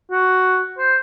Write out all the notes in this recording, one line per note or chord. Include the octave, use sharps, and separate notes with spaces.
F#4
C5